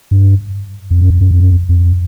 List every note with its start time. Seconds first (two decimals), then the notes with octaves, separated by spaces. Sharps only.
0.11 G2
0.91 F2
1.01 F#2
1.10 F2
1.21 F#2
1.31 F2
1.40 F#2
1.51 F2
1.69 F2